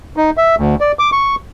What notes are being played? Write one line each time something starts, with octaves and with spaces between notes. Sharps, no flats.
D#4
E5
D2
D5
D6
C#6